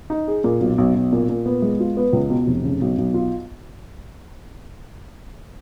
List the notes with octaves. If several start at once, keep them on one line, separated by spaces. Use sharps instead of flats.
D#4
G#4
A#2
B1
B1
B1
A#2
A#2
B3
G#3
F4
B3
C#2
B2
F1
C#3
B1
B1
F4